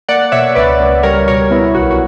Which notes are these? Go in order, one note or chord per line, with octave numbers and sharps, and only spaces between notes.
A#3 D5 F#5
B2 C#5 E5
C#2 B4 D5
C#2
G3 A#4 C#5
B2 A#4 C#5
B3 E4
B1 F#4
F#4